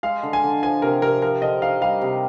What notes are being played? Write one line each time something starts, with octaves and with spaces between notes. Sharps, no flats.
G#3 F5
D3
G#5
D3
F3 G#5
C3 A#4
C3 A#4
F3 A#4
D3 D#5
D#4 F5
G3 F5
C3